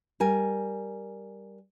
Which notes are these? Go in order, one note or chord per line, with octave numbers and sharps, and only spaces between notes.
G3 A#4 G#5